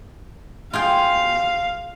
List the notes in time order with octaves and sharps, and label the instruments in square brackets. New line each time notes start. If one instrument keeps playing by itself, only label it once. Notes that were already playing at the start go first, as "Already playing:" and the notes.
[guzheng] F4 G#4 G5 [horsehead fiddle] F5